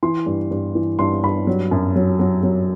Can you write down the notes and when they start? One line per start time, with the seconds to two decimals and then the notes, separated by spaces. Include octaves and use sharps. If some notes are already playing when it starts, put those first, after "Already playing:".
0.03 E3 C6
0.26 G2
0.51 G2
0.75 E3
0.99 G2 C6
1.23 G2 B5
1.47 F#3
1.71 F#2
1.96 F#3
2.19 F#3
2.43 F#3